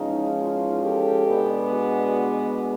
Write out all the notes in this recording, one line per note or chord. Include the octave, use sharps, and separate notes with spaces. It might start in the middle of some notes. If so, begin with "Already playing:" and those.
Already playing: E2 C#3 F3 G#3 C#4 D#4
D#4 F4
G4 A4
B2 G#3 B3 D4
F#4 G#4